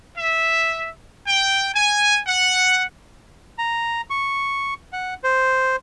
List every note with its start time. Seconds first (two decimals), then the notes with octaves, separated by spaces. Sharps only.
0.18 E5
1.27 G5
1.75 G#5
2.27 F#5
3.58 A#5
4.10 C#6
4.93 F#5
5.24 C5